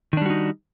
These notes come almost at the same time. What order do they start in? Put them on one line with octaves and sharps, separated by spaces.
D#3 D4 G3 F#4 D#4